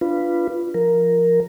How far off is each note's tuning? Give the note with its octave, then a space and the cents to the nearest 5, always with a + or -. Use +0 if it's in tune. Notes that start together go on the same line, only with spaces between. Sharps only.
D4 +0 F4 -20 B4 +0
F3 +0 A#4 +0